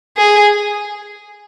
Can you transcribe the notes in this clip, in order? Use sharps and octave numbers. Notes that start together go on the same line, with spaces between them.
G#4